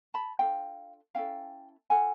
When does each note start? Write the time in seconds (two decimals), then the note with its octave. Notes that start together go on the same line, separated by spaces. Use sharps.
0.14 A5 B5
0.39 D4 F4 A4 F5 G5
1.15 C#4 E4 A4 F5 G5
1.90 F4 A4 F#5 G#5